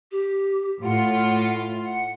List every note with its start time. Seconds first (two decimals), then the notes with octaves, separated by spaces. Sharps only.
0.11 G4
0.83 A2 F4 F#5
1.83 F#5